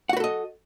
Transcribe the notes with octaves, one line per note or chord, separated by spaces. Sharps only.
F#4 A4 B4 D#5 F#5